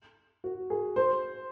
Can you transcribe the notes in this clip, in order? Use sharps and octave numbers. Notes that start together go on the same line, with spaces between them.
F#4
G#4
C5